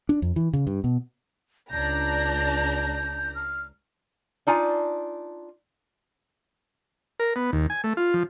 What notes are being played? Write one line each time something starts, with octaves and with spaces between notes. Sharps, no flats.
D4
F2
E3
C#3
G2
B2
C#2 D4 A#5 G6
F6
D4 D#4 F4 G#5
A#4
B3
D#2
G#5
A3
F4
F3